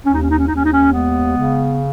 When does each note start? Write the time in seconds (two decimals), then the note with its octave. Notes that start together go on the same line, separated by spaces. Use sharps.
0.05 D#2 C#4
0.14 D#4
0.22 C#4
0.30 D#4
0.39 C#4
0.47 D#2 D#4
0.56 C#4
0.64 D#4
0.72 C#4
0.92 G#3 B3
1.35 C#3